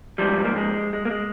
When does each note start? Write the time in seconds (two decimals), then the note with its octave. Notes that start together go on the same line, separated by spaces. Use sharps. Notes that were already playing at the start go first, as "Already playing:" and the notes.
0.18 G#2 F3 G3
0.44 A#3
0.56 G#3
0.93 G#3
1.05 A#3
1.11 G#3